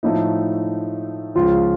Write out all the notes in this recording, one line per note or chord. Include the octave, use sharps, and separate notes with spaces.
A2 F3 A3 D#4
C#2 C#3 F3 F4